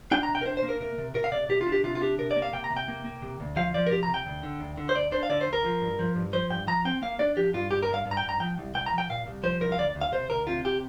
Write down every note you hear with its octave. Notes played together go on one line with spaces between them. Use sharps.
D4 G5
A#5
C3
G5
A#4
D4 C5
C5
A#3
A#4
C3 A#4
C3
C3 A#4
F5
C3 D5
C3 G4
F4
D4
G4
C3 F4
F4
D4 G4
C3 A#4
D5
A#3
F5
C3 G5
A#5
C3
G5
A#3
A#3
C3
D2
F3 F5
F3 D5
A#4
C3 G4
A#5
C3
G5
D2
D3
D2
D3
C5
D2 D5
D4 C5
F5
D3 D5
C5
D2
A#4
F3
G2
F3
G2
F3 C5
G2 G5
F3 A#5
C4 G5
A#3 F5
D4 D5
F3 G4
G2 F4
G2 G4
A#4
G2
F5
G2
A#5
G5
G2
A#5
F3 G5
C2
C2 G5
A#5
F3
G5
A#2 F5
C2
F3 C5
C2 A#4
F5
D2 D5
D2
F5
C3 C5
D2 A#4
C3 F4
G4